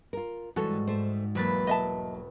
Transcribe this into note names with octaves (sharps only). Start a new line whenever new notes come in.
F4 A#4
G#2 E3 G3 F#4 A4
A3 C5
E1 F#3 A#3 B4 A6
D#5 E5 A5